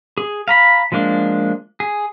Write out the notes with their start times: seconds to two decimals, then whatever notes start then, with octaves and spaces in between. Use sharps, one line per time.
0.18 G#4
0.48 F5 A#5 B5
0.92 F3 G#3 A#3 D4
1.80 G#4